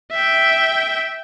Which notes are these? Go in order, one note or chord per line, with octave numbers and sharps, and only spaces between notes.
E5 G5